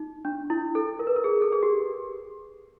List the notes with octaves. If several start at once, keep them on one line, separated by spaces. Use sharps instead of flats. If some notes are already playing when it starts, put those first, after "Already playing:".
Already playing: D#4
D4
E4
A4
A#4
B4
A#4
G#4
A4
G#4
G4